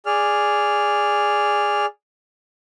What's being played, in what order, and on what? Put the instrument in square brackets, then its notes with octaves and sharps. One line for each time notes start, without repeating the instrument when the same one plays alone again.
[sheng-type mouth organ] G#4 D5 F6